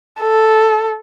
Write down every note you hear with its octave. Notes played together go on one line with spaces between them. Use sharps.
A4